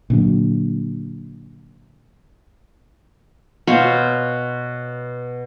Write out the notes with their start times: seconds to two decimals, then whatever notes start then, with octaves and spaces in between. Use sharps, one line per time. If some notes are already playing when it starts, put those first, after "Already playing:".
0.10 A#2 D3 F#3
3.67 B2 C5 C#5 F5